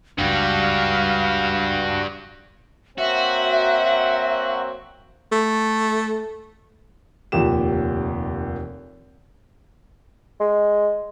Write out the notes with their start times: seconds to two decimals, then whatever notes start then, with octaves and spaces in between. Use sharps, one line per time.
0.18 F#1 C#2 G2 G3 F#4 F5
2.98 F#3 A#3 C4 F#4 E5
5.32 A3
7.32 F1 D#2 A#2 G4 E7
10.40 G#3